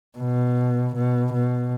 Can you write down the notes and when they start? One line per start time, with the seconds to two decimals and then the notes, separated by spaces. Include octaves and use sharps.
0.18 B2
0.96 B2
1.33 B2